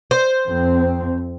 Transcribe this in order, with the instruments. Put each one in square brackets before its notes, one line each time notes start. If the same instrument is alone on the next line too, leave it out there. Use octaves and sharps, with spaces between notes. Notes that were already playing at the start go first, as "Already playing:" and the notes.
[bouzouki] C5
[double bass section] F2 C4